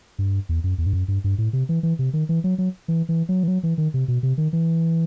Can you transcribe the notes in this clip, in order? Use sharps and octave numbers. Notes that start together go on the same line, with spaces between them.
G2
E2
F#2
E2
G2
F#2
G2
G2
A2
C3
E3
E3
C3
D#3
E3
F#3
F#3
E3
E3
F#3
E3
F#3
E3
D#3
C3
B2
C3
D#3
E3